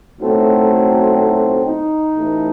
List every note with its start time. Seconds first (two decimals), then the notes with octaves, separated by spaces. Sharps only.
0.19 B1 A2 F#3 A3 C4
1.17 C4
1.65 D#4
2.14 A1 A2 E3 A3